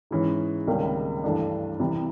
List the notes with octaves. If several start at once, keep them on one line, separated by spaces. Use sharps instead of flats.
G#2 E3 G#3 C#4
C#2 C3 D#3 G3 A#3
G2 E3 A3 D4
C2 C3 E3